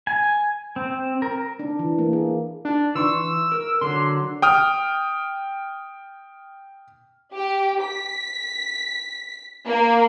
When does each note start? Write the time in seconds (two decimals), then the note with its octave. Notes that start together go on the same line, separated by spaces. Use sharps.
0.07 G#5
0.76 C4
1.22 A#4
1.59 D4
1.79 E3
1.99 A#3
2.13 G#4
2.65 D4
2.95 E3 C6 C#6 E6
3.52 A#4
3.81 D3 F#3 C6
4.42 G5 D#6 F6
7.33 G4
7.83 B6
9.66 A#3